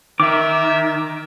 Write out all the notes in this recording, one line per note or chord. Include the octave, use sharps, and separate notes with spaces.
D#3 A#4 E5 D6